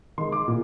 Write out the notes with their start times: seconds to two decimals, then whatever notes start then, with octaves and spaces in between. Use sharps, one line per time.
0.18 D#3 G#3 C6
0.32 D6
0.48 A#2